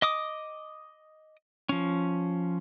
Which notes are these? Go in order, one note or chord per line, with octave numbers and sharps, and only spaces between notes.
D#5 D6 D#6
F3 C#4